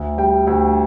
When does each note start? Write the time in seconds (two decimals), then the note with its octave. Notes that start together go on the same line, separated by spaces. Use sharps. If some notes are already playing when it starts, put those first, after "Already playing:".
Already playing: D2
0.18 G3 G5
0.47 D2 G5